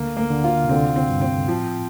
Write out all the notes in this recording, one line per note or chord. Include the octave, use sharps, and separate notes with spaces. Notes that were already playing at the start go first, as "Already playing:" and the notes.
Already playing: D2 D3 A#3
A#3
D2 D3
F4
C3
D2 D3 C4
C4
G2
C4
A2 F3